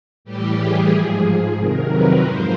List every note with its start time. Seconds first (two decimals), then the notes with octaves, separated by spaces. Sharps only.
0.25 A2 E3 G3 G4
0.58 G#4
0.90 G#2 F3
1.56 F2 C3 D#3 F#3 A#4
1.89 B4
2.22 G#2 F3 C5